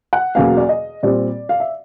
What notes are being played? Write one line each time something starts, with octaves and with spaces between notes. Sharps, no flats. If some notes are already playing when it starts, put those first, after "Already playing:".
F#5
E2 B2 F#3 A#3 C#4 F5
D5
D#5
A#2 G3 C4 D5
F5
E5